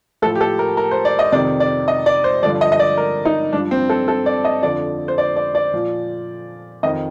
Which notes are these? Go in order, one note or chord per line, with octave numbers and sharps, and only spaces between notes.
A2 F3 A4
G4
A4
A#4
A#4
C5
D5
D#5
F2 C3 D#3 D5
D5
D#5
D5
C5
G2 D3 F3 D5
D#5
D#5
D5
A#4
D#4
G2 F3 D4
C4
A4
A4
D5
D#5
F2 D3 F3 D5
C5
D5
D5
D5
A#2 F3
F2 D#3 D#5